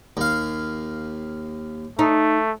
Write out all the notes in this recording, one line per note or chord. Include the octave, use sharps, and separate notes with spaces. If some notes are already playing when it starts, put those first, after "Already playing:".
D#2 F5
A3 D#4